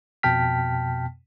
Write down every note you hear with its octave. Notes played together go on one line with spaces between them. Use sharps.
F2 B2 G5 A5 F6 B6